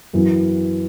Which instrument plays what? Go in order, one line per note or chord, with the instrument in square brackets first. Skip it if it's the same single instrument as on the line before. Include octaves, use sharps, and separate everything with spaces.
[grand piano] F#2 E3 B3